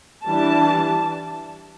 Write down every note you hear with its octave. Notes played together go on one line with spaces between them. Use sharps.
E3 G3 D4 A5